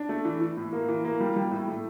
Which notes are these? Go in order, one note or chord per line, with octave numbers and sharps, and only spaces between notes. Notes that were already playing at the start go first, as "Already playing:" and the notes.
Already playing: D4
A3
E3
E3
A2
A#3
E3
A#3
G3
G3
A2
A3